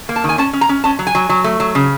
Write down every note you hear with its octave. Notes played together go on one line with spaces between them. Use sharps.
A#3
A5
D#3
G#5
C#4 A5
C#4
A#5
C#4
C#4 A5
F#3
G#5
F#3
F#3
A3
F#3
C#3